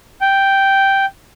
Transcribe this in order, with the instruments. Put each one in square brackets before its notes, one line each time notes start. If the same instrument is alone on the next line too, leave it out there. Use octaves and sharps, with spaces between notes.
[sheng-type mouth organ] G5